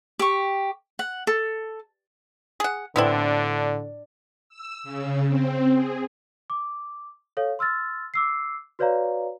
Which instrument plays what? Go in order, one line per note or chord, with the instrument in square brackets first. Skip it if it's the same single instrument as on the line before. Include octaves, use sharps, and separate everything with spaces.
[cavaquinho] G4 C#6
F#5
A4
[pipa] G#4 F#5
[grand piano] A2 [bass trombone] D3 [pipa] B3 C4 E4 [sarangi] D4
[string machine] E6
C#3
C4
G#4
[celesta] D6
A4 C#5 F5
C6 E6 F6 A6
D6 E6 C7
F#4 B4 C#5 D5 F5 A#5